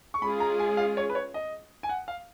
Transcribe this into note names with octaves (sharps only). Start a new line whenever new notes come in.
C#6
G#3 C#4 F4 G#4 B5
A#5
G#5
F5
C#5
B4
C#5
D#5
G#5
F#5
F5